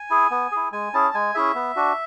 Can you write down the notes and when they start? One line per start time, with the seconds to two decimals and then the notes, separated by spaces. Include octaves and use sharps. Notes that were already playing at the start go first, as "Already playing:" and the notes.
Already playing: G#5
0.10 E4 G#4
0.31 B3
0.52 E4 G#4
0.72 G#3 G#5
0.94 C#4 E4 G#4 A5
1.14 G#3 G#5
1.35 C#4 E4 G#4 E5
1.55 B3
1.76 D4 F#4